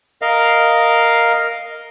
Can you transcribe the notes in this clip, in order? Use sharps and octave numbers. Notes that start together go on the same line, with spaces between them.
A#4 D#5 F5